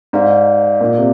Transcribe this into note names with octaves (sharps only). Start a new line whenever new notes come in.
G#2 G4 D5 F5
A#2
C3